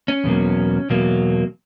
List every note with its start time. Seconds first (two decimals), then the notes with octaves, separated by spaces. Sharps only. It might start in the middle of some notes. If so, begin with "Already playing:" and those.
0.08 C#4
0.24 E2 B2 F#3 A#3
0.90 E2 B2 F#3 A#3